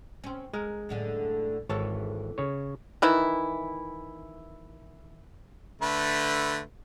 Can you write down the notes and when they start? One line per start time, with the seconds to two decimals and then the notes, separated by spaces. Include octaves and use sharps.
0.24 C4 C#4
0.54 G#3 A#4
0.89 F#2 A2 D3
1.69 G#1 D#2 E3 A4 C#5 A5
2.38 C#3 C#5
3.02 D#3 E3 E4
5.82 D3 A3 B4